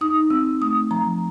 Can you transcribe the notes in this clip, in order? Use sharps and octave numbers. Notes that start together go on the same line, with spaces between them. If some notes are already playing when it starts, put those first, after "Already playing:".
D#4 D#6
C4 E6
A3 D#6
F3 A#5